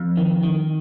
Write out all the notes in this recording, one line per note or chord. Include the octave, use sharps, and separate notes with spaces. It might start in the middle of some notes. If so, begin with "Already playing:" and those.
Already playing: F2
D#3
D#3